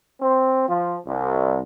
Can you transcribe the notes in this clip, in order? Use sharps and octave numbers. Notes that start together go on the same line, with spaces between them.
C4
F3
C2